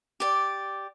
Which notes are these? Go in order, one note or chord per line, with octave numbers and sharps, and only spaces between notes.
G4 D5